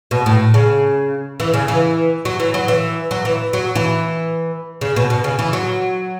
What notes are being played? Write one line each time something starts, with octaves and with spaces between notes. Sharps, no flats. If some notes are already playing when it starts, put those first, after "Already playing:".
B2
A2
C#3
E3
C#3
E3
F#3
E3
F#3
E3
F#3
E3
F#3
E3
C#3
B2
B2
C#3
E3
F#3